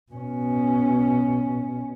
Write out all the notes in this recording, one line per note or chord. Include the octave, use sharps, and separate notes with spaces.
B2 C#4